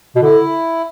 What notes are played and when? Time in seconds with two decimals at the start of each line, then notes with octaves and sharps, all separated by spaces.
0.16 B2
0.22 D3 E4